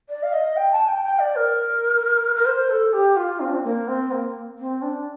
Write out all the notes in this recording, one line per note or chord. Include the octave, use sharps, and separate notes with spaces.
D5
F5
D#5
G5
A5
G5
G5
D5
A#4
A#4
C5
A4
G4
F4
C4
D4
C4
A#3
C4
A#3
C4
D4